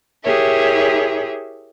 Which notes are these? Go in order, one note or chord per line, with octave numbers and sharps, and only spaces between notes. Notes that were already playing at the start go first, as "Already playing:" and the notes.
E4 G4 G#4 A#4 C#5 E5